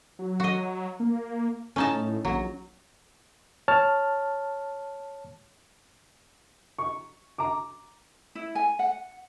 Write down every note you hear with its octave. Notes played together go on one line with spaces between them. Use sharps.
F#3
F#4 D#5
A#3
A2 C#4 D#4 A5
A#1 F#3
C#5 A5 F6
C#6
A#5 D6
E4
G#5
F#5